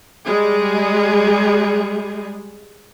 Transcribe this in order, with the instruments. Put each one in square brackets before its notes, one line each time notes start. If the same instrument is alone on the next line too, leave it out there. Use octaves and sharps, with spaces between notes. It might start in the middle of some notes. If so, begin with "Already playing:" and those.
[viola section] G3 G#3 G#4